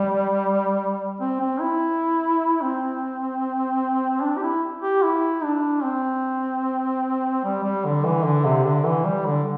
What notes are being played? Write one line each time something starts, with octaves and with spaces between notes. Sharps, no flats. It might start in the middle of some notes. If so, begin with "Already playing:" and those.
Already playing: G3
C4
C4
E4
C4
D4
G4
E4
G4
E4
D4
C4
G3
G3
D3
E3
D3
C3
D3
E3
G3
D3